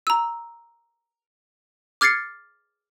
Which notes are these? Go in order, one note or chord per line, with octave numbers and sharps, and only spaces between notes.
A#5 E6
D6 F6 G#6 A6 C7 C#7